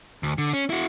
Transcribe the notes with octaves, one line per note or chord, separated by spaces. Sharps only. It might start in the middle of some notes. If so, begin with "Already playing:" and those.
D2
D3
C#4
E4 F#4